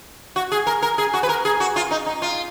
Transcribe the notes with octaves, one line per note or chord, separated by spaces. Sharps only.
F#4
G#4
A#4
A#4
G#4
F#4
B4
A#4
G#4
F#4
F4
D#4
D#4
F4